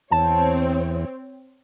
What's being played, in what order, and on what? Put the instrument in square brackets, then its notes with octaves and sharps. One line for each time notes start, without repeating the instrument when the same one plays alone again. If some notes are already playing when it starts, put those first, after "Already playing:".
[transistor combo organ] E2 [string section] C4 C#5 [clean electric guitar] A5